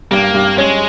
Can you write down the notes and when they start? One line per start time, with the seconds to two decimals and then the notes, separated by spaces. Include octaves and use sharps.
0.11 G2 A#3
0.34 G2
0.58 G#3 C#4